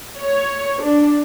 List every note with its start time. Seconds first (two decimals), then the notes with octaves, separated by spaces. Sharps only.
0.19 C#5
0.82 D4